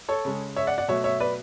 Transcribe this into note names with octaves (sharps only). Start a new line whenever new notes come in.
A4 C#5
C#3 G#3
C#5 E5
D5 F#5
D5 F#5
B2 F#3 A3 C#5 E5
C#5 E5
B4 D5